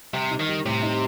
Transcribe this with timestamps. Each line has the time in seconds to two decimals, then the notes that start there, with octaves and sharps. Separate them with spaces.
0.13 C3 G3
0.30 D#4
0.40 D#3
0.48 G3
0.65 A2 C3
0.82 D#4